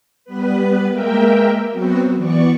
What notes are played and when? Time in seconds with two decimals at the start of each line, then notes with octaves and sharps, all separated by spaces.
0.25 G3 B3 B4
0.91 G#3 A#3 A#4 E5 G5
1.71 F#3 B3 C4 F#4
2.16 E3 B3 D5 C#6